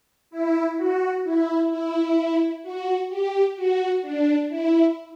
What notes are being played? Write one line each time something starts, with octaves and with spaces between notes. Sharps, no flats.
E4
F#4
E4
E4
F#4
G4
F#4
D4
E4